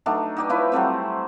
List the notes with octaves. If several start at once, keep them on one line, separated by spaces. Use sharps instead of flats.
F#3 A3 D4 D#4
D#4 G4 D5
F3 E4 B4 C#5
F#3 G3 A3 C4